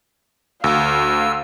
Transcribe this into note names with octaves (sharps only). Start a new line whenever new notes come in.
D2 F5 E6